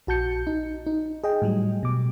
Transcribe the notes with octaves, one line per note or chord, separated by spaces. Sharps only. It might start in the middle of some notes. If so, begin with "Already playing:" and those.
A#1 F#4 A5 G6 C#7
D#4
D#4
G#4 D#5 G5
A2 F#3 G3
B2 D6